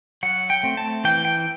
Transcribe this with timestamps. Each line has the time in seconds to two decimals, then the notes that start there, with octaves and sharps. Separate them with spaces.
0.23 F#3 F#5
0.50 G5
0.63 A3 C4
0.77 A5
1.04 E3 G5
1.25 G5